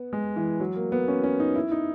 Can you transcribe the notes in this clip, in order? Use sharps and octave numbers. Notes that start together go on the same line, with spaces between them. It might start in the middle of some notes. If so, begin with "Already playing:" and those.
Already playing: B3
G#3
E3
F#3
A#3
B3
C#4
C#4
D#4
E4
D#4